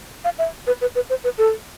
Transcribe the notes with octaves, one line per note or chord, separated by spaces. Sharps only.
F5
E5
B4
B4
B4
C5
B4
A4